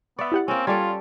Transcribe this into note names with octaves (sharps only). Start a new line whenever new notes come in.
B3 D5 E5 C#6
E4 G4 F#5
A#3 C4 C#4
G3 F4 A4 D5 A5 G#6